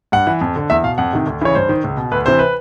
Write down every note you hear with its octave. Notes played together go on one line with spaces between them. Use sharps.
G2 F#5
E3
F2
D3
E2 E5
B2 F5
F2 F#5
C3 D#3
D2
C#3 E3 C#5
G2 C5
D#3
C#2
B2
D2 B4
C3 E3 C5
B4